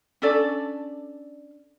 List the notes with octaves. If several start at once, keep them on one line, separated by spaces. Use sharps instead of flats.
C#4 D4 A4 D5